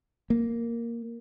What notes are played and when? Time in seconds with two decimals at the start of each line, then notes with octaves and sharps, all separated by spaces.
0.30 A#3